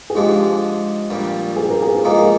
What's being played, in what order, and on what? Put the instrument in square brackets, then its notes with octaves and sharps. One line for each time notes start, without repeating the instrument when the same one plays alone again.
[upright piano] G#4
[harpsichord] G#2 F3 G#3 D4 [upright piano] G4
[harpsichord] A#1 A#2 G3
[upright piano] G#4
A#4
G#4
A#4
[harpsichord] G#2 F3 A#3 D#4 [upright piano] G#4
[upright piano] A#4